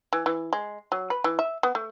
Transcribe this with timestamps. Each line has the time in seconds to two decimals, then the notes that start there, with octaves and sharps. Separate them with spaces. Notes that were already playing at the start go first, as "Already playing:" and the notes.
0.13 E3
0.26 E3
0.53 G#3
0.92 F#3
1.10 B4
1.24 E3
1.39 E5
1.63 B3
1.75 A3